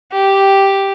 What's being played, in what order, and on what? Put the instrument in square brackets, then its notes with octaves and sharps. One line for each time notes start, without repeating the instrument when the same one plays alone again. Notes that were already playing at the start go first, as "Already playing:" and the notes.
[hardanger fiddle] G4